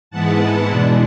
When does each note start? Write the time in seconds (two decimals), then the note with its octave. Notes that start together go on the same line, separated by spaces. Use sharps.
0.11 G#2 E3 G#3 B3 E4 F#5 A5
0.67 E2 B2 G#3 D4